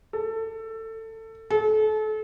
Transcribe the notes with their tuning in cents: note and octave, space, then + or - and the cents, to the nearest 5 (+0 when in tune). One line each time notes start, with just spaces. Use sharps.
A4 +20
A4 -35